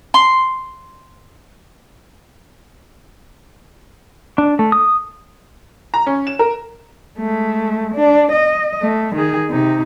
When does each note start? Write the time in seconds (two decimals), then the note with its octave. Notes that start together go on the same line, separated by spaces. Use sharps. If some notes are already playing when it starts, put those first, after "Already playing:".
0.14 C6
4.38 D4
4.59 A3
4.72 D#6
5.94 A#5
6.06 C#4
6.27 E7
6.39 A#4
7.18 G#3 A3
7.95 D4
8.32 D#5
8.82 A3
9.16 D#3 G#4
9.50 C3 D#4